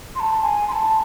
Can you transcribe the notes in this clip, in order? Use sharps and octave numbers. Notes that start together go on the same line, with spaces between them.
C6
A5
G#5
C6
A5